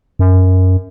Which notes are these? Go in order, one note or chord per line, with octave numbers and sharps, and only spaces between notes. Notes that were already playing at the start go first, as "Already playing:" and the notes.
F#2